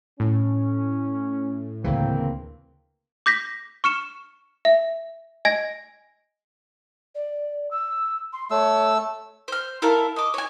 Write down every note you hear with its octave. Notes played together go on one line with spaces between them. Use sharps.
A2 C#4
D2 C#3 E3 A#3 C4
D6 G6 A#6 B6
C#6 F6 C#7 E7
E5
D#5 G#5 G#6 A#6 D7
D5
E6
C6
A3 C#5 E6
C5 F6
E4 A4 A#4 F5
D#5 D6
C#5 G#5